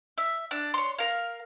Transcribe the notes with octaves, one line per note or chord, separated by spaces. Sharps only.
E5
D4
C#5 C6
A#4 F5